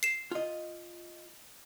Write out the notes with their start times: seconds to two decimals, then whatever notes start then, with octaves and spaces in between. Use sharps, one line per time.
0.03 C7 E7
0.31 F4 D#5